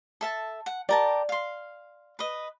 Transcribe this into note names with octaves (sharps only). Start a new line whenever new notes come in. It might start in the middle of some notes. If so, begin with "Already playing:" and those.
A4 E5 A5
F#5
G4 A#4 D5 A5
F5 C6
B4 D#5